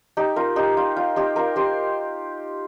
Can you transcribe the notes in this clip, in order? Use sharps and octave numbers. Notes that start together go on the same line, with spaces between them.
D#4 G4
F4 A#4
D#4 G4
F4
F4
D#4 G4
F4 A#4
G4 C5